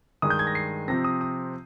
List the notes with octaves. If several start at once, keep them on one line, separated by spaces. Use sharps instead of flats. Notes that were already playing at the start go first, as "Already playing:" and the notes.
G2 D#3 G#3 D#6
G6
G#6
A#6
C7
C3 F3 C4 A#6
D#6
D#6